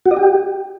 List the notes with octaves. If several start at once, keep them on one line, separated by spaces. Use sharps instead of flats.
F#4
D#5
G4